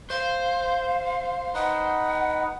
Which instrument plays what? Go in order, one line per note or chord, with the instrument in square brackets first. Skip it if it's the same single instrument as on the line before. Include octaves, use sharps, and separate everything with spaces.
[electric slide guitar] C5 [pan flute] F5
[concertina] D#4 B4 [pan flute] F#5